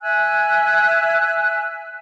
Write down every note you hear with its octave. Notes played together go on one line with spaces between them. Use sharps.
E5 G#5 E6 F#6